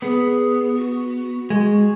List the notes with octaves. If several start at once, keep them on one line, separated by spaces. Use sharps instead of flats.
B3 G#4
F#4
G#3